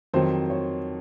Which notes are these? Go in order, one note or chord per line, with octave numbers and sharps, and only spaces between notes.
F2 D#3 F#3 C5
C#5